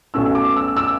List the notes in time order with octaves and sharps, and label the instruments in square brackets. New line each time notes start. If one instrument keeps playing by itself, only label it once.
[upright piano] B1 B2 A3 C#4 E6
D6
E6
E6